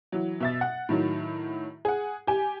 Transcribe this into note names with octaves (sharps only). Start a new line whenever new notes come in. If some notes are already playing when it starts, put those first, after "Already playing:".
E3 F#3
B2 E5 A6
F#5
A2 D#3 F#3
G#4 F#5
G4 G#5